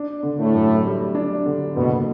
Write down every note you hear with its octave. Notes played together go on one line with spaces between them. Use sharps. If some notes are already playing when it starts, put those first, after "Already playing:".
Already playing: D4
D3
A2 A3
F#2
G3
D4
D3
F#1 B2 B3